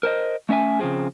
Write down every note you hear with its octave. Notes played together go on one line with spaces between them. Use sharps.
A#4 C5 D#5
A3 C#4 D#5 E5 G#5
C#3 E3 F3 C4 G#4